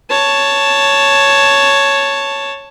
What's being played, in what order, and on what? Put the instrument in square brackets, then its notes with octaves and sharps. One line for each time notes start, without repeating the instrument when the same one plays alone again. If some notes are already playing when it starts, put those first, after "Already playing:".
[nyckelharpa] C#5 A5